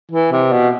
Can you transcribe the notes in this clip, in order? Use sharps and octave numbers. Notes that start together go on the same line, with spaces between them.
E3
C3
B2